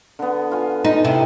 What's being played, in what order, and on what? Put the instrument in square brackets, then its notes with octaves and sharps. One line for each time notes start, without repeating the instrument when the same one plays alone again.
[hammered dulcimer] D3 B3
F4 G#5
[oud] D#4
C3 E4